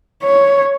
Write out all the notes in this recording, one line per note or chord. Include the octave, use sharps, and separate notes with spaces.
C#5